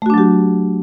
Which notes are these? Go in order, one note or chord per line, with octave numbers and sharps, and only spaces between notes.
F#3 A3 D4 F#4 G4